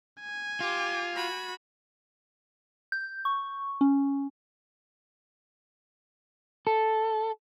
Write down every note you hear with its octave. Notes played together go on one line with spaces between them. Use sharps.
G#5
F4 G4
F#4 B5
G6
C#6
C#4
A4